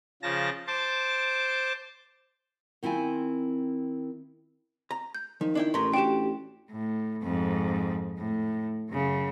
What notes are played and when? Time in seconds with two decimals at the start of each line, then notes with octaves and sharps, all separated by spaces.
0.22 C#3 F3 A5 A#6
0.67 C5 A5 D6
2.83 D#3 C4 E4 F4 G#5
4.91 A#5
5.15 G6
5.41 D#3 F3
5.55 D4 E4 G5
5.74 A1 A2 A#4 C6 B6
5.94 D4 F#4 G4 G5 E7
6.71 A2
7.22 F2 G#2
8.18 A2
8.90 F#2 C#3